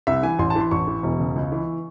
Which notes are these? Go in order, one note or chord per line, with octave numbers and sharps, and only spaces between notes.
C2 E5
E3 G#5
A1 C6
A5
E3 C6
A1 C#6
E3
E1
C#3
C#2
E3